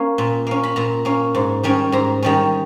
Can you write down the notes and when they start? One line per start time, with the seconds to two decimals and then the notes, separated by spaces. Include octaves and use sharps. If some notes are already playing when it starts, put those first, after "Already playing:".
Already playing: A#3 C#4
0.18 A#2
0.47 A#3 C#4
0.63 B5
0.76 A#2 A#5
1.05 A#3 C#4
1.35 G#2
1.63 D#3 G3 C#4
1.92 G#2 A#5
2.23 D#3 G3 C#4